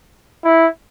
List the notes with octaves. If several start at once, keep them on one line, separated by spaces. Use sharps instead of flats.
E4